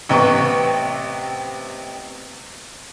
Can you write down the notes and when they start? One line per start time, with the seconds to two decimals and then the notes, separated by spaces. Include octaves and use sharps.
0.09 A1 C3 B3 C#6